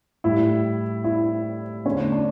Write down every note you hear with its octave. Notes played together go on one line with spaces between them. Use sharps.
A2 G3 E4
E4
E2 D3 A3 C#4
D4